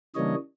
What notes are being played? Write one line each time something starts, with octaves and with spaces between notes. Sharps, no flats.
C#3 E3 G3 A#3 D4 C#5 D#5